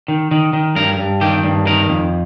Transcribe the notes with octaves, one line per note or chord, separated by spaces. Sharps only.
D#3
D#3
D#3
G2 A#4
G2
D#3 G4
G2
D#3 A#4
F2